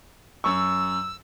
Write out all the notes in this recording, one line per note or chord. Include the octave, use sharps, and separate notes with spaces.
F#2 C#6 E6